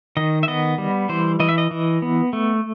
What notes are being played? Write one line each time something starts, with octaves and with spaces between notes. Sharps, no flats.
D#3 D#5
E5
B3 D#5
G3
E3 C5
E3 D#5
E5
D#5
E3
B3
A3